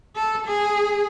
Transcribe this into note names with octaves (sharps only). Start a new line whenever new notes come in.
A4
G#4